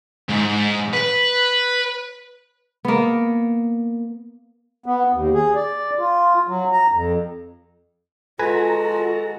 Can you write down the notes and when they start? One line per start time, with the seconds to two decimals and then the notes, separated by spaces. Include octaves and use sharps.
0.29 G#2
0.93 B4
2.85 A#3 B3
4.86 B3
5.13 D#2
5.34 G#4
5.55 D5
5.99 F4
6.48 F#3
6.72 A#5
6.92 F2
8.39 G#3 F4 F#4 A4 B4 G#5 A#5